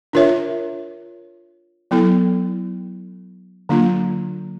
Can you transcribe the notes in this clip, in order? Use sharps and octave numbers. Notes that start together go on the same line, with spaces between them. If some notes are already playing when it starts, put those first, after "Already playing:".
D4 F4 A#4 C#5 E5
F#3 B3 E4 A4
D3 F#3 A#3 D4 F4